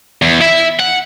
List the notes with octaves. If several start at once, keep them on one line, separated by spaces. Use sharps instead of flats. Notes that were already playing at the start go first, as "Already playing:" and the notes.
E2
E4 E5
F#5